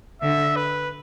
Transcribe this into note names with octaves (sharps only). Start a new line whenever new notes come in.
D3 E5
B4